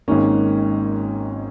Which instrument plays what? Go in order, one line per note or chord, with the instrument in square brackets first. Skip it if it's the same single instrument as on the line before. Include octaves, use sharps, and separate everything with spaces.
[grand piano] G#1 G#2 D#3 A#3 C#4